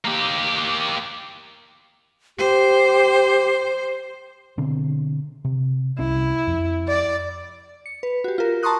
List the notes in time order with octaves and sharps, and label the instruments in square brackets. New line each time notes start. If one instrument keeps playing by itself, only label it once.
[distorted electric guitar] A#3 G4
[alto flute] G4 [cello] C5
[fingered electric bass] B2 D3 C4
C3
[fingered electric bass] C2 C3 C#4 [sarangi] E4
[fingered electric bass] F2
[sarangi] D5
[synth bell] C#7
B4
F#4 G4
F4 A#4
A5 A#5 C6 C#6 D#6 F#6